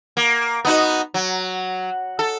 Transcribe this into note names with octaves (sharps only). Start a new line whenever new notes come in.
A#3
B3 D#4 F#4
F#3
A4